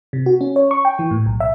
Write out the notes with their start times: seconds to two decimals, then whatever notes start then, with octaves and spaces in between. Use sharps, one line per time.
0.13 C3
0.26 F#4
0.41 C#4
0.56 C#5
0.71 C#6
0.85 G5
0.99 E3
1.11 A2
1.26 B1
1.40 E5